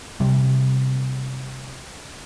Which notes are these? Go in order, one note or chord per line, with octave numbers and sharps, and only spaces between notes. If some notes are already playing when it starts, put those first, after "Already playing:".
C3 G3